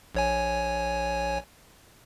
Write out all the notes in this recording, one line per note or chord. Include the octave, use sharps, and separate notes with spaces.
A#1 C#5 G#5